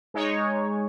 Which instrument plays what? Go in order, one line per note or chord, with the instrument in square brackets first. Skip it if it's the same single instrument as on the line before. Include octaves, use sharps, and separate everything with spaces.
[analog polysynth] G#3 D#4 C#5